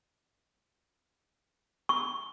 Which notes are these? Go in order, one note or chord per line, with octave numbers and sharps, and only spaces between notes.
C#6